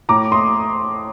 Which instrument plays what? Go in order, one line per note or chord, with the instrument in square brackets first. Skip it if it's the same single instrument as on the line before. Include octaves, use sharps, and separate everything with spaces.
[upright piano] A2 A#5 D6
C6 D#6